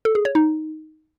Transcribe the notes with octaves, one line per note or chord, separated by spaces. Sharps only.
A4
G#4
C#5
D#4